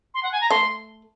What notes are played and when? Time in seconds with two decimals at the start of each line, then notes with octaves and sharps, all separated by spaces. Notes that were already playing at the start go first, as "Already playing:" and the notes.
0.14 C6
0.23 F#5
0.32 G#5
0.41 A#5
0.50 A3 C6